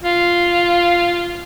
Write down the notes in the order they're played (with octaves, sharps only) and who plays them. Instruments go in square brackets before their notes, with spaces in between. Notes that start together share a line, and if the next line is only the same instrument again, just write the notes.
[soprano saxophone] F4